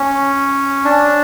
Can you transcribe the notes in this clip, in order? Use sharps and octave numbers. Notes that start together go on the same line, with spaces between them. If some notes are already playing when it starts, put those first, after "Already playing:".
Already playing: C#4
D4